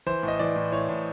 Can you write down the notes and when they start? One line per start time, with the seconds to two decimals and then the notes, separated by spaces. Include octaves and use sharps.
0.06 E3 C5
0.23 A2
0.28 D#5
0.39 E3 D5
0.56 A2
0.72 A2 C#5
0.89 A2